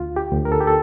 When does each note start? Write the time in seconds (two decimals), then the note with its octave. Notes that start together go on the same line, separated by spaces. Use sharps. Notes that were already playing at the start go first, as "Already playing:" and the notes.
Already playing: D2 F4
0.16 G4
0.31 D2
0.45 A#4
0.52 A4
0.60 G4
0.67 A4